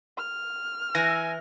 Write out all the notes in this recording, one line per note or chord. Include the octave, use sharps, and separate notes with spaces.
F6
E3 G#5 A#6